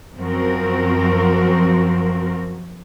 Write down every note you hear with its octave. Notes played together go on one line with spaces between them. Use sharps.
F#2 F3 C4 F#4 A#4